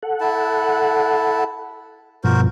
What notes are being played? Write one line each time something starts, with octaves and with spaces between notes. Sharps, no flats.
A4 F#5
E4 A5
G2 B2 F3 F#4 A#4 C5